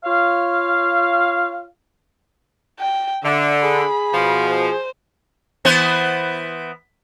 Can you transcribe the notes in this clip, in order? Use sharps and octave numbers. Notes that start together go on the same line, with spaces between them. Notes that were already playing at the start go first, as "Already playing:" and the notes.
F4 C#5 F5
G5
D3 E5
G#4 B5
B2 F3
C5
E3 B3 C5